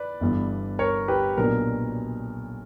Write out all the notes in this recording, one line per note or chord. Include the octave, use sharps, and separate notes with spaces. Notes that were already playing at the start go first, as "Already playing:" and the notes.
Already playing: B4 D5
G1 G2 E3 B3
A#4 C#5
G4 B4
B1 A#2 F#3 B3 D4 A#4